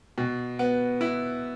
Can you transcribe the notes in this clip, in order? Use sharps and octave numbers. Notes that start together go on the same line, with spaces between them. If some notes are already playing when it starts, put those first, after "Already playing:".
B2
B3
E4